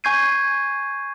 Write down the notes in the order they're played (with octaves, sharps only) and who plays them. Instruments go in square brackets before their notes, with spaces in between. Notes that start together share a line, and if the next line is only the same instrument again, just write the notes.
[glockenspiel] G#5 C#6 G6 G#6 C7 D#7